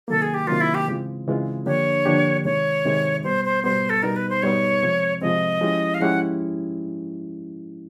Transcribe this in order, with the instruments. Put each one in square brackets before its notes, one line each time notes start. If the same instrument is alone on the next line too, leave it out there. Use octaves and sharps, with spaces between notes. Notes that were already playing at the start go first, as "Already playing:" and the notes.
[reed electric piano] C3 D#3 F#3 A#3 [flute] A4
[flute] G#4
G4
[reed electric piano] C3 D#3 F#3 A#3 [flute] F4
[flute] E4
G4
[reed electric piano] C#3 E3 G#3 C4 F4
C#3 E3 G#3 C4 F4
[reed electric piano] D3 F3 A#3 D4 G4 [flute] C#5
[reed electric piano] D3 F3 A#3 D4 G4
[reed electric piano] C3 D#3 G#3 [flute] C#5
[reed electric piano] C3 D#3 G#3
[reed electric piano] B2 G3 B3 [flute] C5
[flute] C5
[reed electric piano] B2 G3 B3 [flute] C5
[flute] A4
[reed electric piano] B2 G3 B3 D#4 [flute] A#4
[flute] B4
C5
[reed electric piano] B2 G3 B3 D#4 [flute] C#5
[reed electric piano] C3 F3 G#3 C4
[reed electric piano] C3 F3 G#3 C4 [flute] D#5
[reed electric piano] F3 G#3 C#4 E4 G4
[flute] F5
[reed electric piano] F3 G#3 C#4 E4 G4 [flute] F#5